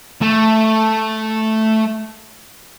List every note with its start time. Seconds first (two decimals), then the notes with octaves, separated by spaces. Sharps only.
0.22 A3